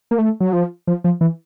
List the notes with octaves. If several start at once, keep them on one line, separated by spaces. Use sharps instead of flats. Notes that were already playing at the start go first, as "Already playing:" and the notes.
A#3
A3
F#3
F3
F3
F3
E3